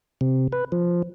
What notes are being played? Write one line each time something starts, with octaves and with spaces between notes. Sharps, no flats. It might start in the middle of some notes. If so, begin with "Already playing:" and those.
C3
B4
F3